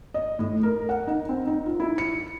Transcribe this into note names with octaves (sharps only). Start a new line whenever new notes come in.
D#5
A2
A#4
F#5
D#4
C4
D#4
F4
E4
C#7